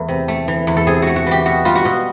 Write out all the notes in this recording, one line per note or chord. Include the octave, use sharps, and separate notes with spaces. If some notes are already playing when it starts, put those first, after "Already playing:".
Already playing: E2 E3 A3
C3
A3
E3
E2
A4
C3 G#4
A3 F#4
F#4
E3 G4
B2 F#4
G3 F4
F#4
B2